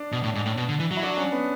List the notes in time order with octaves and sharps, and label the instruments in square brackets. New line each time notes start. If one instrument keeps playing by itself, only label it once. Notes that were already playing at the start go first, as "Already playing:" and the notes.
Already playing: [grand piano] D4
[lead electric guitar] B2
A2
G#2
A2
B2
D3
E3
F#3
[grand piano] E4
D4
C#4
B3